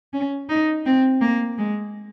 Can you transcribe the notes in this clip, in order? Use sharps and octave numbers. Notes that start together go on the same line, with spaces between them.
C#4
D#4
C4
A#3
G#3